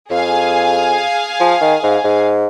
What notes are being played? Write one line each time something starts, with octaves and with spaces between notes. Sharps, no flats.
F2 G#4 F5 G#5
F3
D#3
G#2
G#2